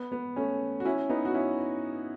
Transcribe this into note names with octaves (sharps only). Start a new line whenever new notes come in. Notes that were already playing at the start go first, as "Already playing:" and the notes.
Already playing: B3
B3
A3 C#4
F#4
C#4 E4
B3 D#4
F#4
C#4 E4